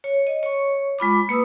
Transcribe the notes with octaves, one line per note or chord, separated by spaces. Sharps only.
C#5
D#5
C#5 C#6
G#3 F4 B5 D6
A#3 B4 D#6 E6